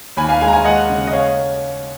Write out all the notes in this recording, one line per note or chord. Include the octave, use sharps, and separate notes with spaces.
D#2 G#5 B5
F5 G#5
G#3 F5 G#5
A#5
F5 G#5
G#3 D#5 F#5
C#3
D#5
C#5 F5